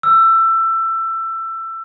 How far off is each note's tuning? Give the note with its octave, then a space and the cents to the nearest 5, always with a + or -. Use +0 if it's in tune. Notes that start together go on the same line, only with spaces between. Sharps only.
E6 +20